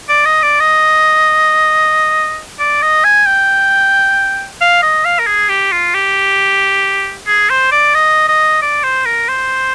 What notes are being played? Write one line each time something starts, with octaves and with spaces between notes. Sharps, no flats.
D5
D#5
D5
D#5
D5
D#5
G#5
G5
F5
D#5
F5
A#4
G#4
G4
F4
G4
G#4
C5
D5
D#5
D#5
D5
C5
A#4
C5